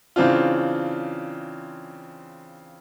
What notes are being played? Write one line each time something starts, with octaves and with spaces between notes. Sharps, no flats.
C#3 E3 C4 D4 F4